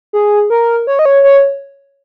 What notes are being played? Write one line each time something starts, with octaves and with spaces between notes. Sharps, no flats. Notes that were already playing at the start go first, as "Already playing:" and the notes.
G#4
A#4
C#5
D#5
C#5
C#5